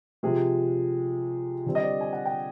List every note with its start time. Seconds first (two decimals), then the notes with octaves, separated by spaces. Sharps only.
0.23 C3 F3 G#3 G#4
1.66 D3 G3 C4
1.75 D#5
1.83 D5
2.01 G#5
2.13 F#5
2.26 G5